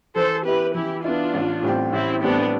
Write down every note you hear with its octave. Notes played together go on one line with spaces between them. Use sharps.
E3 A4 C5
B3 E4 G4 B4
E3 E4 G4
B3 D4 E4 F4
A1
A2 G3 C4 G4
A1 C4 E4
A2 G3 B3 C4 D4 G4